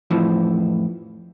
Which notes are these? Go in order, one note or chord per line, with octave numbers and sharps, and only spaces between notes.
F2 A2 E3 F3